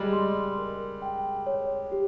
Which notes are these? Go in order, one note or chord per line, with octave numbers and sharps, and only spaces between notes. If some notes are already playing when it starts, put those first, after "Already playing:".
Already playing: G3 G#3 D#5
C6
A#4
G5
C#5
G4